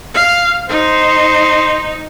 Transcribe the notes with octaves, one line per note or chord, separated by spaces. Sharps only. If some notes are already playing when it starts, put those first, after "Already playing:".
F5
D#4 C5